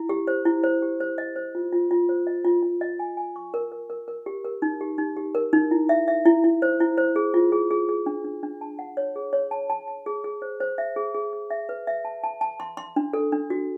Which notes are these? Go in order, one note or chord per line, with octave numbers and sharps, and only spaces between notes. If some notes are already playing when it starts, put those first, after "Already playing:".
Already playing: E4
G4
C5
E4
C5
G4
C5
D#5
C5
F4
F4
F4
C5
D#5
F4
F4
D#5
G#5
G#5
C#6
A#4
A#4
A#4
A#4
G4
A#4
D#4
G4
D#4
G4
A#4
D#4
E4
E5
E5
E4
E4
C5
E4
C5
G#4
F4
G#4
G#4
G#4
D4
D4
D4
A5
F#5
C#5
G#4
C#5
A5
A5
A5
G#4
G#4
C5
C5
E5
G#4
G#4
G#4
E5
B4
E5
A5
A5
A5
C6
C6
D4
A4
D4
F#4